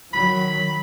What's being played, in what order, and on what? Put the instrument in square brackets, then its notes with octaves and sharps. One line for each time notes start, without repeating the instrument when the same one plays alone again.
[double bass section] D#3 F#3 [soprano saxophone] B5